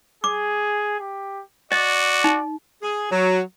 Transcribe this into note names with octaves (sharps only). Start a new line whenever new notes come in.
G#4 D6
G4
F#4 D5 D#5
D#4
G#4
F#3